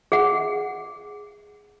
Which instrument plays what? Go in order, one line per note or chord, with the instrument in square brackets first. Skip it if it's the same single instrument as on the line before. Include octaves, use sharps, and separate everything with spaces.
[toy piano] G#4 F#5